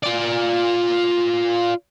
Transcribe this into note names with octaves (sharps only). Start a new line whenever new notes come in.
F4 D5